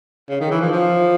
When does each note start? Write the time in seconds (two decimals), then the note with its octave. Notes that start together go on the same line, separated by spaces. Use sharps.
0.29 C#3
0.40 D#3
0.51 E3
0.61 F3
0.72 F3